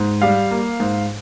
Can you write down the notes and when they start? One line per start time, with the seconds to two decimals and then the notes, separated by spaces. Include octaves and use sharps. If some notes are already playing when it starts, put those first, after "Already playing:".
Already playing: G#2
0.22 G3 F5
0.51 A#3
0.80 G#2